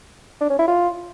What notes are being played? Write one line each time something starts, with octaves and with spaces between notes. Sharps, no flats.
D4
C#4
E4
F4